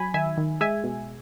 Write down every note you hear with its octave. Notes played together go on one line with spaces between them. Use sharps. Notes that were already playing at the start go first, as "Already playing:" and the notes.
Already playing: F#3 G#5 B5
D#3 E5 G#5
D#3
G#3 E5 G#5
B2